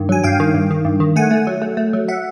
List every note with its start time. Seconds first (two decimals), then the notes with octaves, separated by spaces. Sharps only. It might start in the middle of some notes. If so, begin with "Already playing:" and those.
Already playing: G2 D#3
0.09 F#3 G#5
0.23 G2 F5 G5
0.40 D#3
0.54 G2
0.71 D#3
0.85 G2
1.00 D#3
1.16 A3 F#5 G#5
1.31 A3
1.47 F#3
1.62 A3
1.77 A3
1.93 F#3
2.08 E5 F#5